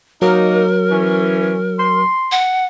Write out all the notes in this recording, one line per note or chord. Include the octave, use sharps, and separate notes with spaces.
F#3 A#3 D#4 A#4
E3 C#4
C6
F#5